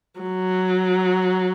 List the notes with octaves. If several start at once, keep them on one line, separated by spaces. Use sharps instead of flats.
F#3